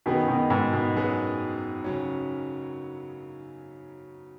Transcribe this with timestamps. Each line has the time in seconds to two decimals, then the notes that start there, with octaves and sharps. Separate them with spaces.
0.06 F#2 B2 D#3 F#3 B3 G#4 B4
0.28 B2 D#3
0.50 G#2
0.73 B2
0.95 F#2 F#3 B3 G#4 B4
1.84 C#3 F#3 C#4